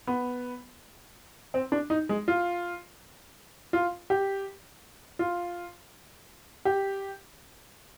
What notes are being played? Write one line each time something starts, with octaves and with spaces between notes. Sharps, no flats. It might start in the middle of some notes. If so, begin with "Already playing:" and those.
B3
C4
D4
D#4
G#3
F4
F4
G4
F4
G4